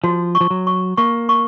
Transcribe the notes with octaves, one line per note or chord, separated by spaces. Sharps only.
F3 F#4
C#6
F3
F#3
C#6
A#3 C#6
C#6